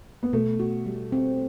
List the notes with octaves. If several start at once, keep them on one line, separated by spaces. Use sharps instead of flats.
B3
B2 A3
F#4
G3
C4